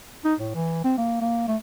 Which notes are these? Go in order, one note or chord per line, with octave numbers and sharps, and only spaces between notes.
D#4
A2
E3
C4
A#3
A#3
A3